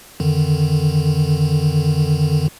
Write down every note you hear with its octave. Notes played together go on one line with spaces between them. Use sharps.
F2 D3 D#3